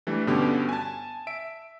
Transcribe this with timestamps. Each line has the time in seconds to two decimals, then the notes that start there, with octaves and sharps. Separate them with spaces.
0.07 E3 G3 A3 D4
0.27 G2 B2 D3 B3 C#4 G4
0.69 G#5 A5
1.27 E5 D7